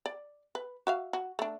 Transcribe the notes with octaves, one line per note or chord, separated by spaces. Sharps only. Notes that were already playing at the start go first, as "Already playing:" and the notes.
D5
B4
F#4 E5 F5
F#4
A3 D4